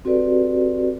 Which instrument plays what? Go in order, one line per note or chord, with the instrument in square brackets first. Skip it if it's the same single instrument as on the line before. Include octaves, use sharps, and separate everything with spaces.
[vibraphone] C4 F#4 G4 A4 B4 D5